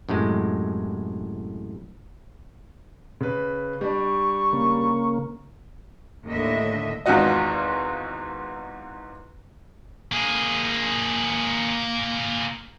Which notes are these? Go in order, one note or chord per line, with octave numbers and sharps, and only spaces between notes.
F#2 A2 C3 G#3
C#3 B4
G3 D4 C#6
C#3 A#3
D#2 A2 D3 D#5 E5
G#1 E2 G#2 F4 F#4 D#5
A#3 G#4